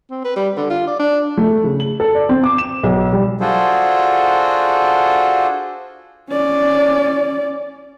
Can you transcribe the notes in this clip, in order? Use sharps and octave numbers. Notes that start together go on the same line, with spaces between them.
C4
B4
G3
D3
F4
D5
D4
A3
C#3
F#7
A4
D5
C4
D6
E7
B1
G3
D4 F4 F#4 G#4 A4 C5
C#4 D5